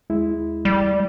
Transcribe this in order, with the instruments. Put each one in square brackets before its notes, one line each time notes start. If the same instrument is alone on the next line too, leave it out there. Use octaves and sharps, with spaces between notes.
[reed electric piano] D#2 G#3 E4
[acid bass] G3